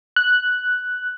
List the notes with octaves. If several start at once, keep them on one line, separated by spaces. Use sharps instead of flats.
F#6